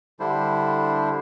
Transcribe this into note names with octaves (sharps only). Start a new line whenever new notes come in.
D3 G3 D4 E4 C5